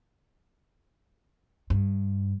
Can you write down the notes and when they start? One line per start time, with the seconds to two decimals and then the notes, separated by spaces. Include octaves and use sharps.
1.70 G2